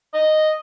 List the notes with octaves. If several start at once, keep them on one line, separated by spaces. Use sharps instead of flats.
D#5